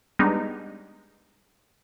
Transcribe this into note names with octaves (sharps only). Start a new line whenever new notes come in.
G3 G#3 B3 D4 D#4